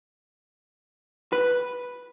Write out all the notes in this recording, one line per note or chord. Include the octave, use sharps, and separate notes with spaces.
B4